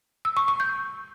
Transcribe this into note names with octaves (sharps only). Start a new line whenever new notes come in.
E6
C#6
C#6
G6